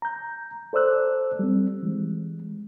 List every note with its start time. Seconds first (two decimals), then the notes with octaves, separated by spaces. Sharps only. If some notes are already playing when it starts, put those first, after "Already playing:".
0.02 A#5 G6
0.73 A4 C5 D5 E6 F#6
1.39 G3 C4
1.83 E3 G#3